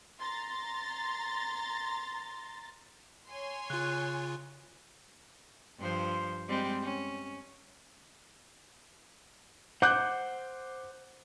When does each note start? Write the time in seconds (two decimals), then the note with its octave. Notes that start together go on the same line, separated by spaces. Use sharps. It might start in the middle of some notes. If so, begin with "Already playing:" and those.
0.20 A#5 C6 A6
3.29 C#5 G#5 C6
3.70 C#3 F4 F#6
5.79 G2 F3 C5
6.48 G3 G#3 C4
6.82 C#4
9.82 C5 F#5 D6 F#6 G6